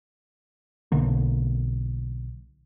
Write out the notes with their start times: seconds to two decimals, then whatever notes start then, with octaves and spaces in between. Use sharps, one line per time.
0.92 B1 D3 A#3